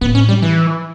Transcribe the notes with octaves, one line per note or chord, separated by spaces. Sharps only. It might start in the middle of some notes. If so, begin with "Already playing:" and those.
A2 B3
C#4
G3
E3